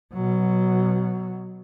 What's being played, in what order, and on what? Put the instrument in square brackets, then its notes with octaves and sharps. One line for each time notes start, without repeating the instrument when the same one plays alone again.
[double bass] B2 F#3